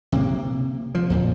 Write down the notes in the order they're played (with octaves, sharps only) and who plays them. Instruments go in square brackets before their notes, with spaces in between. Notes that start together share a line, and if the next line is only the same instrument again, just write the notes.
[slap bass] C3 A#3
F3
F2 A#2